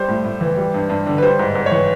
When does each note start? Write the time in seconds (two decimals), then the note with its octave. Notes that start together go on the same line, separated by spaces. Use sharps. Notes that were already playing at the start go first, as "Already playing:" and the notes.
Already playing: G3 C5
0.08 A2
0.24 A2
0.41 E3
0.57 G3
0.74 G2
0.89 G2
1.06 D3
1.18 B4
1.23 G3 C5
1.39 G#2
1.55 G#2
1.66 C#5
1.71 E3